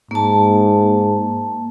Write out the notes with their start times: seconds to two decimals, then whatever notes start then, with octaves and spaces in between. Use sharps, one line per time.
0.11 G#2 A#3 A5